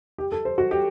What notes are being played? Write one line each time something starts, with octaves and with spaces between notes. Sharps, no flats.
G4
A4
C5
F#4
G4